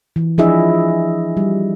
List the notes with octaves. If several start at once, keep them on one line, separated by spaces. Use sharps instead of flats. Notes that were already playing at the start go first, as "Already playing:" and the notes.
E3
F3 D4 E4 G#4 D#5 E5
G3